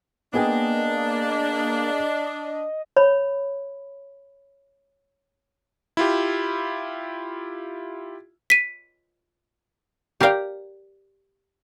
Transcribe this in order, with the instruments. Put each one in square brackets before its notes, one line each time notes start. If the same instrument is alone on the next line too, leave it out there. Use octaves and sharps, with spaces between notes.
[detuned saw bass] A#3 [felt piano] B3 G#4 G5 [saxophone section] D4 [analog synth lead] D#5
[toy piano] C#5 B5
[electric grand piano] E4 F4 G4
[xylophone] B6 D#7
[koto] G4 A#4 D5 F5 G5